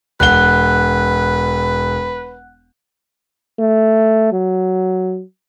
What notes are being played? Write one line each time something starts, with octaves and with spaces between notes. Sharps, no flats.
E1 B4 F#5 F#6 G7
A3
F#3